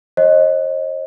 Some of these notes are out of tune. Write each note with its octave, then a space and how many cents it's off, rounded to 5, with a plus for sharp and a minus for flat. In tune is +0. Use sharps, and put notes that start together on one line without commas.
C5 +45 D#5 +0